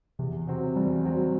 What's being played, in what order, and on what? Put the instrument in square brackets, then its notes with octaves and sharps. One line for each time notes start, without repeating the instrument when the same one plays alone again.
[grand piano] E2 [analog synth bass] C3
[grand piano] C3 F#3 C4 F#4
[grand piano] E2 [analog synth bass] G3
[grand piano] C3 F#3 C4 F#4 [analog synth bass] G3